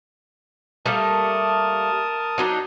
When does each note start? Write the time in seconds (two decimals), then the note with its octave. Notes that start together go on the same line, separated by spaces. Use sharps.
0.86 G3 A3 A#3 A#4 A5 D#6
2.38 F#3 D4 D#4